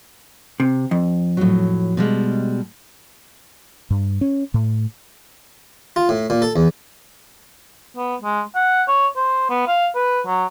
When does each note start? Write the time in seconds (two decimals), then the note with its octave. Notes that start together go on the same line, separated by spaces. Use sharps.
0.60 C3
0.91 F2
1.37 A2 F#3
1.97 B2 G3 G#3
3.90 G2
4.21 C#4
4.54 A2
5.96 F4
6.09 A2
6.30 A#2
6.42 A4
6.56 E2
7.97 B3
8.21 G#3
8.55 F#5
8.88 C#5
9.17 C5
9.50 B3
9.67 F5
9.95 B4
10.26 F#3